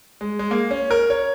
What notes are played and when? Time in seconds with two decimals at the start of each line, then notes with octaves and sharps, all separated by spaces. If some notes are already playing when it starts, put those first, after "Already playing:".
0.21 G#3
0.39 G#3
0.51 A#3
0.71 C#4
0.91 A#4
1.10 C#5